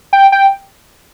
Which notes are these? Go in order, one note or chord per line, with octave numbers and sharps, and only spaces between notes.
G5
G5